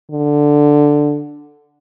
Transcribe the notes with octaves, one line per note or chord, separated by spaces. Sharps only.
D3